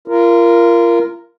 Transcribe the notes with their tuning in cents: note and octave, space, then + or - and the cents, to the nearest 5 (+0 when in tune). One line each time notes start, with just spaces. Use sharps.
F4 -30 A#4 +0